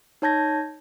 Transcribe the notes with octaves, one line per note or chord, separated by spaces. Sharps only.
D#4 C#5 A5 G6 G#6 A#6